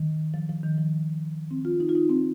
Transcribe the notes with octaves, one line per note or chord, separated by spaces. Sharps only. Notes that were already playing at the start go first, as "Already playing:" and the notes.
Already playing: D#3
F3
F3
D#3
F3
C4
F4
D#4
F4
D#4
C4